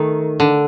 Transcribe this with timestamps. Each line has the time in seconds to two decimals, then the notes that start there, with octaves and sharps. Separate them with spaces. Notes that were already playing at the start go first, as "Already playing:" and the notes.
Already playing: D#3 A3
0.40 D3